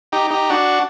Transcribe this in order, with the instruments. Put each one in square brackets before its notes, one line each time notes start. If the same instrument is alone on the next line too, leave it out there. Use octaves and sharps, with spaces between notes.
[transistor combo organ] D#4 G4
D#4 G4
D4 F#4